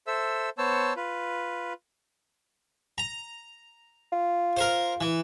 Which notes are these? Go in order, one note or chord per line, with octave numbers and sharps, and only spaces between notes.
A4 C5 E5 E6
B3 C5 C#5 A5 E6
F4 B4
A#5
F4
A#4 C5
E3